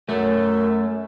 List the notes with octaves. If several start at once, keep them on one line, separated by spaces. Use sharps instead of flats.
F#2 A3